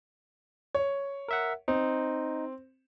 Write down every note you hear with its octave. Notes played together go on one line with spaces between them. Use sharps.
C#5
A#4 E5 F#5
C4 D#4